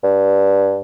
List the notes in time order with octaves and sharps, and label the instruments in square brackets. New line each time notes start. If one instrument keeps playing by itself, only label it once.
[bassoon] G2